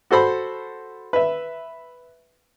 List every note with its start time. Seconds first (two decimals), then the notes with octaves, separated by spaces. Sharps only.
0.11 F#4 A4 C5 B5
1.13 B4 E5